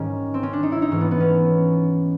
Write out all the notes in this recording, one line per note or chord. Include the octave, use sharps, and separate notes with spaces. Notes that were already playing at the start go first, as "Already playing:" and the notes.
Already playing: G#2 D#3 G3 C#4
C4
C#4
D4
D#4
E4
D#4
G#2 E3 A3 C#4
B3
B3
C#4